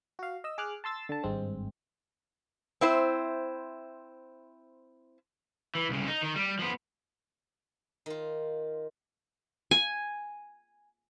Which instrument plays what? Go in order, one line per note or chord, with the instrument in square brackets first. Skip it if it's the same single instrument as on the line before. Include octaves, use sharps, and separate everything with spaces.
[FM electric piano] F#4 F5
D#5 E6
G#4 D6 F6 F#6
A5 C6 E6 A6
D3 A5
G#1 G2 G#3 C4
[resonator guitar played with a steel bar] C4 E4 C5
[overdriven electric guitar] E3
C2 C#3
D#4
D#3
G3
F3 B3
[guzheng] D#3 F4
[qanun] G#5